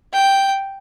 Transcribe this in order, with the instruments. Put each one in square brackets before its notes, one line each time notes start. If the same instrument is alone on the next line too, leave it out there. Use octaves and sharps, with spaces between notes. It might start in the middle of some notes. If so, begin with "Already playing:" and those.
[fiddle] G5